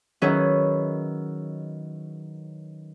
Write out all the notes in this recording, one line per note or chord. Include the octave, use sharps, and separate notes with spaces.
D#3 F#3 C#4 E4 G#4 B4